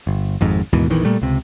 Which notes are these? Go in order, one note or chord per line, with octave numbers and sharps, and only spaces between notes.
G1
G#1 F2 G#2
D#2 G#2 B2 E3
A#1 E2 D#3 E3
A#2 G3 A3
C#2 C3